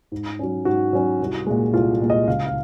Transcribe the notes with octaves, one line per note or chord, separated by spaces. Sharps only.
G#2
F#3 C#4
G#2 F#4
F#3 C#4
C2
A#2 G#3
C2 F4
A#2 G#3
D#5
C#2 F5
F5